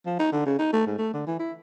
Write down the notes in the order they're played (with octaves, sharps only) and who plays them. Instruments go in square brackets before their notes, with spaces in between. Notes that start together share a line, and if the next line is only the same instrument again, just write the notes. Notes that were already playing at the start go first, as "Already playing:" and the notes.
[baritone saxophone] F3
D#4
D3
C#3
D#4
A3
G#2
A3
D3
E3
E4